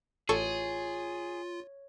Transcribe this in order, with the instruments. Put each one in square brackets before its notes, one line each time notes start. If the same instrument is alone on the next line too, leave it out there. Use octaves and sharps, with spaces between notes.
[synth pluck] A1 A4 C#6 [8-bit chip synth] F4 [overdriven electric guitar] G#4 [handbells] C#5